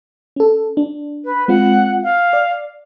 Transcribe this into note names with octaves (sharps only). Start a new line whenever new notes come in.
C#4 A4
D4
B4
G#3 C4 F4 F#5
F5
D5